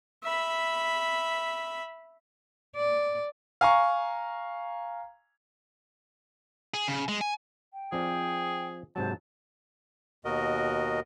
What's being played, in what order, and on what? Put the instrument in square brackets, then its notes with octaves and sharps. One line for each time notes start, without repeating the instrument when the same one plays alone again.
[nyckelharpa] E5 B5
[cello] D5
[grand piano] F5 G#5 A#5 C#6
[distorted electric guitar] G#4
C#3
G#3
G#5
[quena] G5
[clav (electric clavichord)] F3 C4 D5 [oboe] G#4
[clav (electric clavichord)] G#2 C3 F#3 [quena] C5 [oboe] A5
[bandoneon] D#2 B2 F#4 A#4 D#5